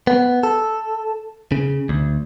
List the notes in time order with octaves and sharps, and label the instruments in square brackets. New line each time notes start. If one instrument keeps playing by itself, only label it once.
[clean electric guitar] B3
A4
C#3
D2